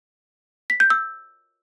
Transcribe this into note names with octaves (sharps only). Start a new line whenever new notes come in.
B6
G6
E6